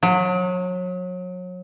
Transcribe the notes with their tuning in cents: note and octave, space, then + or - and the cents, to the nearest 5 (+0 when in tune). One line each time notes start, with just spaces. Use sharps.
F#3 -30